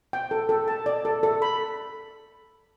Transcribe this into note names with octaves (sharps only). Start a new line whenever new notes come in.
G5
A4
A4
A5
D5
A4
A4
B5